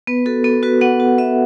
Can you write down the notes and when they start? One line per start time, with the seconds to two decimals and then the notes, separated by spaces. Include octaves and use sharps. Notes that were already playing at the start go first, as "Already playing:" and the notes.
0.07 B3 B4
0.26 F#4 A4
0.44 B3 A4
0.63 F#4 B4
0.81 B3 F#5
1.00 F#4
1.18 B3 E5